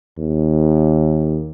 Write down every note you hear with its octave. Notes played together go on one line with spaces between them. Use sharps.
D#2